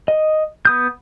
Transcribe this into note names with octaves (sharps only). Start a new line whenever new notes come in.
D#5
B3 D#6 G6